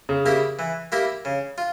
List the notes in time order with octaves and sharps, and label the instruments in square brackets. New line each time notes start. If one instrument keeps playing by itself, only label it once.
[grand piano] C#3
[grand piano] C#3 [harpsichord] A#3 E4 G4 A#4
[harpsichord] E3
A#3 E4 G4 A#4
C#3
F4